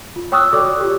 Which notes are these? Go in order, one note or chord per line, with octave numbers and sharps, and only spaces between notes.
F4
C#5 G5 C#6 D#6 E6 F#6
F#4 A4 C#5 D5 D6
F4 G4